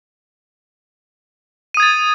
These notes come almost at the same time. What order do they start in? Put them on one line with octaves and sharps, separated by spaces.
D#7 D#6 G#6 A6